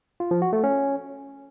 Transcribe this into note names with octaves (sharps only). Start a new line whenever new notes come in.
F4
F3
F#4
A3
C#4